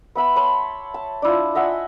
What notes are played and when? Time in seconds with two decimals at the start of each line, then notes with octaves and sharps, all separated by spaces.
0.15 B3 E5 B5
0.36 C#5 A5 B5 C6
0.94 A5
1.22 D4 E4 F4
1.55 D#5 E5 F#5 G#5